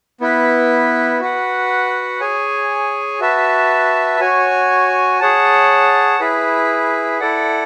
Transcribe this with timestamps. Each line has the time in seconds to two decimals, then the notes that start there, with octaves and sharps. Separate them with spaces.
0.21 B3 E4 B4
1.20 F#4 B4 F#5
2.20 G#4 C#5 G#5
3.20 F#4 B4 E5 A5
4.20 F#4 C#5 G#5
5.20 G#4 C#5 F#5 A5
6.20 E4 G#4 B4
7.20 E4 A4 D5 F#5